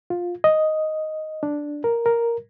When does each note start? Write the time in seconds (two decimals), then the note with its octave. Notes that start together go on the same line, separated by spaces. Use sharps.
0.10 F4
0.44 D#5
1.43 D4
1.84 A#4
2.06 A#4